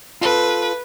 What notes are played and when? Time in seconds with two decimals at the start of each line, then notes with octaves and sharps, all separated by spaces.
0.21 F4 A4 B4